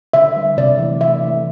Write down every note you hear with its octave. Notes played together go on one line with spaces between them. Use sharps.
D3 E5
G3
C3 D5
E3 A3
C3 E5
E3 A3